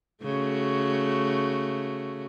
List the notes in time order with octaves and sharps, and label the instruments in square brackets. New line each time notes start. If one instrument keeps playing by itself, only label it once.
[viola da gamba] C#3 A3 F#4